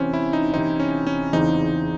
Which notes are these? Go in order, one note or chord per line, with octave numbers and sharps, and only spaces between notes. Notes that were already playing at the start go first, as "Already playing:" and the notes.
Already playing: C3 E3 C4 C#4
E4
D#4
C3 E3 C4 D#4
C#4
C#4
E2 C#3 E3 C4 D#4